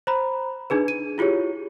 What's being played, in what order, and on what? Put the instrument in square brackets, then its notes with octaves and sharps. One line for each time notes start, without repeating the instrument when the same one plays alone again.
[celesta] C5 A#5 B5
D4 D#4 G#4 B4
D#7
E4 F4 G4 G#4 C#5